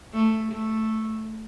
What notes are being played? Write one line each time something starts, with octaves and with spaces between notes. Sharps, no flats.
A3
A3